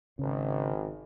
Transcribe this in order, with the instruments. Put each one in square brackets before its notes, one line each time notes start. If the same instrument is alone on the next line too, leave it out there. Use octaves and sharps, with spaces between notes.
[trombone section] G#1 [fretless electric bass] C#3